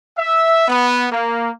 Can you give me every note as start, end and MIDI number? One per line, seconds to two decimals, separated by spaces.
0.18 0.68 76
0.68 1.07 59
1.12 1.51 58